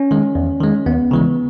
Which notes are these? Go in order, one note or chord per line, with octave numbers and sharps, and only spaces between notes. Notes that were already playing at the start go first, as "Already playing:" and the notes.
Already playing: C#4
D#3 G#3
E2
D#3 G#3
D#2 B3
C#3 E3 G#3